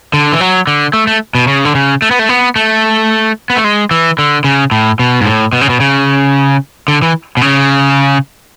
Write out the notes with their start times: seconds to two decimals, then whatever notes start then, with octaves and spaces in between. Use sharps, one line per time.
0.13 D3
0.32 E3
0.40 F#3
0.67 D3
0.93 A3
1.07 A3
1.35 B2
1.48 C#3
1.65 D3
1.75 C#3
2.02 A3
2.11 B3
2.19 A3
2.29 B3
2.56 A3
3.50 B3
3.57 A3
3.64 G#3
3.91 E3
4.19 D3
4.44 C#3
4.71 A2
4.99 B2
5.21 G#2
5.25 A2
5.53 B2
5.61 C#3
5.69 B2
5.80 C#3
6.88 D3
7.02 E3
7.37 B2
7.41 C#3